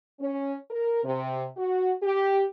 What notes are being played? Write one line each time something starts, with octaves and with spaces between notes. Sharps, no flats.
C#4
A#4
C3
F#4
G4